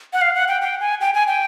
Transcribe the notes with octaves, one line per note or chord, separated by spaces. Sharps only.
F#5
F5
F#5
G5
G5
G#5
G5
G#5
G5